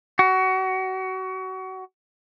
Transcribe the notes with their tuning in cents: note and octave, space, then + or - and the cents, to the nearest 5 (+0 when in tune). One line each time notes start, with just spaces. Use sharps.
F#4 +25